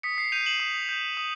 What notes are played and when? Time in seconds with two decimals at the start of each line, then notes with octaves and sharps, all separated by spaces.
0.03 D#6 B6 C#7
0.18 C7
0.32 G6 D#7 F7
0.46 E7 F#7
0.60 D#6
0.89 G6
1.17 D#6